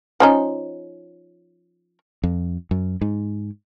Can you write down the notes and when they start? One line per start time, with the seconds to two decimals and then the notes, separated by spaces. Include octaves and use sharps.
0.20 F3 C#4 D#4
2.23 F2
2.71 F#2
3.01 G#2